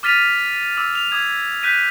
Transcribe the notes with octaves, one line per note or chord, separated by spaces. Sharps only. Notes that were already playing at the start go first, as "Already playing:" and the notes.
D6 F6 A6 B6 D#7 F7
D6 E6
F7
D6 D#6 G#6
F#6 G6 B6 D#7